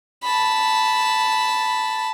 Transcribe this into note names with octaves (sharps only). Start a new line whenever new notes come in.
A5 B5